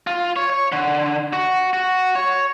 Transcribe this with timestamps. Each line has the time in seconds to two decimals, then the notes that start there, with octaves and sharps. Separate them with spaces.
0.07 F4
0.36 C#5
0.50 C#5
0.72 D3
1.33 F#4
1.73 F#4
2.16 C#5